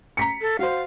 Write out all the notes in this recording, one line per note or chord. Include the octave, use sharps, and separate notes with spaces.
A#5 B6 C#7
A4
F#4 C5 F5